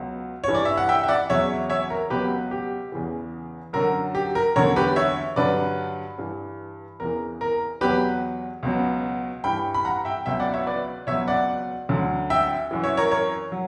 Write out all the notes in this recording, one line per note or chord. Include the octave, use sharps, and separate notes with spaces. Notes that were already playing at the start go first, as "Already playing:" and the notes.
Already playing: C#2 B2 F#3
G2 E3 C#5
D5
E5
F#5
E5 G5
E5
D5 F#5
E2 C#3 F#3 C#5 E5
C#5 E5
A#4
C#2 B2 F#3 G4 B4
G4
E2 C#3 E3
F#2 D3 F#3 A#4
G4
A#4
E2 D3 F#3 A#4 C#5
G4 B4
C#5 E5
G2 D3 F#3 B4 D5
G2 E3
E2 C#3 E3 A#4
A#4
E2 B2 F#3 G4 B4
C#2 B2 F#3
G2 E3 G5 B5
B5
F#5 A#5
E5 G5
C#2 B2 F#3 E5 G5
D5 F#5
C#5 E5
B4 D5
C#2 B2 F#3 C#5 E5
D5 F#5
D2 D3 F#3
E5 G5
F#2 E3
C#5 E5
A#4 C#5
A#4 C#5
F#3